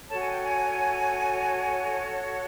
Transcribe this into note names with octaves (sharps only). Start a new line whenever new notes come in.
F#4 A4 C#5 A5
G#5
G5
G#5